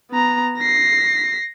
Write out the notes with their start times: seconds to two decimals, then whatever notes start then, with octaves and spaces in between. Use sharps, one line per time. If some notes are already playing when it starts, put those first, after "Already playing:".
0.11 B3 A#5
0.59 A#6 C7